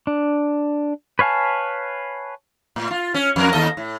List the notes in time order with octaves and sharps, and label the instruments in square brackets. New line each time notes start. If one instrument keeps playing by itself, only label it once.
[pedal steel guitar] D4
B4 C#5 F5 G#5 A5
[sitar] A2
F4
C#4
F2 A#4
D#2 A4 D#5
A2